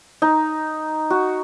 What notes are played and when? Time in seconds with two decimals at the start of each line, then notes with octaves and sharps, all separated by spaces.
0.22 D#4
1.10 F#4